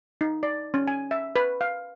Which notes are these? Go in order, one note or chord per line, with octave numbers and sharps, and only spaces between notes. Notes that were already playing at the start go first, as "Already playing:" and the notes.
D#4
D5
C#4
G#5
E5
B4
F5